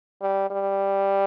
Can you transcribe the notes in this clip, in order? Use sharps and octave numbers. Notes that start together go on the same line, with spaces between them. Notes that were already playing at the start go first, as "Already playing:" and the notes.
G3
G3